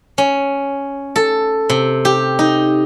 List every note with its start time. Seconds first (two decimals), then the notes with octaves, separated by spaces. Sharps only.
0.18 C#4
1.16 A4
1.70 C3
2.05 G4
2.39 D#4